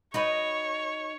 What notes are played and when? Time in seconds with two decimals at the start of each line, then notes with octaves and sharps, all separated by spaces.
0.14 D#4 F#4 B4 C#5